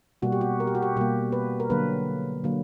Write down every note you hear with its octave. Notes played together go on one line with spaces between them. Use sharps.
B2 G3 A#3 F#4
G4
F#4
A#4
G4
F#4
G4
B2 G3 A#3 G4
B4
A#4
D3 F#3 A#3 B4
D3 F#3 A#3